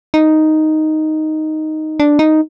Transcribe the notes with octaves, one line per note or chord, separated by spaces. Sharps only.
D#4
D4
D#4